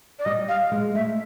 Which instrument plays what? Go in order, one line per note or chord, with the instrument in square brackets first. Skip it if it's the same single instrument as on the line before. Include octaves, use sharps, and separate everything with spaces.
[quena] D5
[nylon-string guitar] G3 [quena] D#5
[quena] F5
[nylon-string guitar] G#3
[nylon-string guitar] A3 [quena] E5